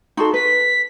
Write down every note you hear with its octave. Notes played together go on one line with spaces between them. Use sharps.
D#4 F#4 A4 C6
B4 B6